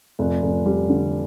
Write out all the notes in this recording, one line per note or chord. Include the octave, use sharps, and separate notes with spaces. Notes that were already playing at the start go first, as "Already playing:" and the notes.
F1
F1
G3
D3